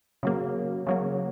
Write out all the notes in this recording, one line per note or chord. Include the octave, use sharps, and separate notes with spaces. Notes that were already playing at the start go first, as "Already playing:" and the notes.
C#3 F#3 A#3
C#3 F#3 A#3